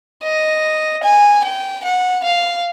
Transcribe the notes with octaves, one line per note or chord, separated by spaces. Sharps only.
D#5
G#5
G5
F#5
F5